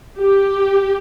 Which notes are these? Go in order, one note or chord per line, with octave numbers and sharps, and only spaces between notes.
G4